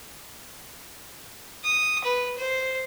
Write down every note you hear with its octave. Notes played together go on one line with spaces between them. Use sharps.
D#6
B4
C5